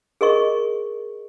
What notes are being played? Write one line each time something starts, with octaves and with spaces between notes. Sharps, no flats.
G#4 A#4 D#5 C#6